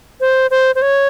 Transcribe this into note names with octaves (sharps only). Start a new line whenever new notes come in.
C5
C5
C5
C#5